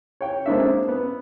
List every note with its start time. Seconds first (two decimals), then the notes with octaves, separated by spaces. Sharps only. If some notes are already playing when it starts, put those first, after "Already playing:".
0.21 C#5 G5
0.46 G#3 A#3 C4 D4 A4 E5
0.88 B3